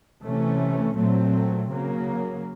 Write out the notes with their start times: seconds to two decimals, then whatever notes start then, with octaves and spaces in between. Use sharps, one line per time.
0.23 C3 E3 A3 C#4
0.96 A#2 F#3 A3 C4
1.69 C#3 F#3 A#3